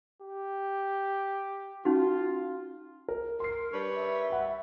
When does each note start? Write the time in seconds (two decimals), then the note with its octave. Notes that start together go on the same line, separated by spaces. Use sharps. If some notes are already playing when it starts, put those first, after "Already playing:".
0.22 G4
1.85 C#4 D#4 F4 F#4
3.08 A#4
3.40 A#4 C6 C7
3.72 G3 D4 B4 C#5
3.95 E5
4.30 F#5 B5